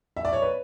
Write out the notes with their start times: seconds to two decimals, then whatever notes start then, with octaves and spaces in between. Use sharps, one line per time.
0.17 E5
0.25 D5
0.33 C#5
0.42 B4